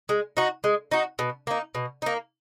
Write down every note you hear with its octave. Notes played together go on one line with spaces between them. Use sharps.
G#3
D#4 F#4
G#3
D#4 F#4
B2
A#3 D#4
B2
A#3 D#4